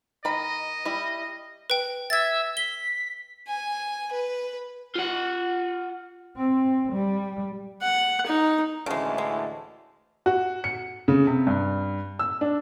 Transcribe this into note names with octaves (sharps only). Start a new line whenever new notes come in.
D#3 D#5 B5
G3 E4
B4 G5
E5 G#6 A6
B6 G7
G#5
B4
F4 F#5
C4
G3
F#5
D#4
D2 A2 C#3 E3 G#3 A5
G#3
F#4
C#7
C#3
C3
G2
E6
D4